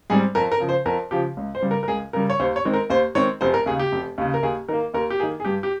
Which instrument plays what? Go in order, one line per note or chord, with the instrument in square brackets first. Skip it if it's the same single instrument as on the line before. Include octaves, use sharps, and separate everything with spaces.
[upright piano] G#2 G3 C4 G#4
F2 A#4
A#4
C#3 F3
C5
F2 A#4
C#3 F3 G4
C#2
C5
C#3 G3
A#4
A#4
C#2 G#4
C#3 G3 A#4
C#5
D#2 C5
C#5
D#3 G#3 C4
A#4
D#2 C5
D#3 G#3 C4 C#5
F1 C5
A#4
D#2 C#3 G#4
G4
F1
D#2 C#3
A#4
D#2 G#4
D#3 A#3 A#4
D#2 A#4
G4
D#3 A#3 G#4
G#4
G2 G4
G4